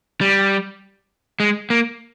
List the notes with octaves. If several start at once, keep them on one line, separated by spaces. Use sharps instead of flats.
G3
G#3
A#3